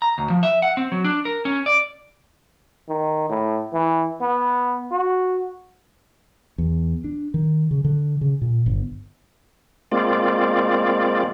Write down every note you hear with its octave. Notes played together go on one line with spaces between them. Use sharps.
A#5
D2
F3
E5
F#5
C4
F#3
D4
A#4
C#4
D5
D#3
A2
E3
B3
F#4
E2
D4
D#3
C#3
D3
C#3
A#2
G1
G#3 A#3 C4 F4 D5